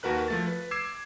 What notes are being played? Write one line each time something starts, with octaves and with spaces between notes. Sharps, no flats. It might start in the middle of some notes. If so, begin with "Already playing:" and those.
D#2 F#4 A#4 B4 F#6
F3 A3 A6
B4
D6 E6 G#6 C7 E7